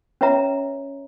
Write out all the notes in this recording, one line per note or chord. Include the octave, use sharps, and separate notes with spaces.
C#4 B4 C#5 E5 A#5